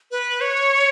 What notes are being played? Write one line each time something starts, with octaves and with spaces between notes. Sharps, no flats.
B4
C#5